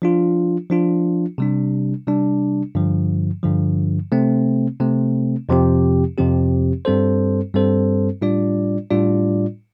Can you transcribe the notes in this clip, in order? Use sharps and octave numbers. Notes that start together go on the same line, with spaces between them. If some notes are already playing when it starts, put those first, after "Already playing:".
F3 D4 F4
F3 D4 F4
C3 G3 D4
C3 G3 D4
G2 D3 F3
G2 D3 F3
C3 A3 C4
C3 A3 C4
F2 C3 F3 C4 G4
F2 C3 F3 C4 G4
G2 G3 C4 A4 C5
G2 G3 C4 A4 C5
A2 G3 D4 F4 D5
A2 G3 D4 F4 D5